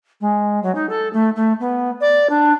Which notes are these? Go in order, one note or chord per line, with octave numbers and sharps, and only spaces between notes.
G#3
F#3
D#4
A4
A3
A3
B3
D5
D4